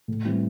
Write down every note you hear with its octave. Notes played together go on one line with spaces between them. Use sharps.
A2
E3 G3 C4 E4